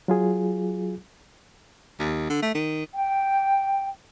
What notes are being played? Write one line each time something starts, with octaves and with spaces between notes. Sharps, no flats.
F#3 F4 G#4
D#2
D3
A3
D#3
G5